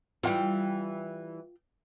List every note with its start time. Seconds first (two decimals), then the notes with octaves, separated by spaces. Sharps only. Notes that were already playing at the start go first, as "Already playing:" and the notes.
0.23 E3 G3 F4 G5